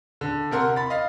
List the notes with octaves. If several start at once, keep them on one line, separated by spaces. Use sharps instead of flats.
D3
C3 A#4 F#5 C6
B5 A6
D#5 F5